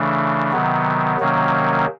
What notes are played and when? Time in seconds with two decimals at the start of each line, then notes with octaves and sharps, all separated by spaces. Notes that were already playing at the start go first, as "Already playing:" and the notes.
Already playing: C#3 E3 A3 D4
0.52 C3 D#3 F#3 B3
1.20 C3 D#3 F#3 A#3 C#4